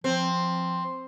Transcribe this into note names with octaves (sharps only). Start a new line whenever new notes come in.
F3 C4